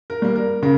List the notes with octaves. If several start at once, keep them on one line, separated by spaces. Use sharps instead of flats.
A#4
G3 A#3
A#4
C#3 A#4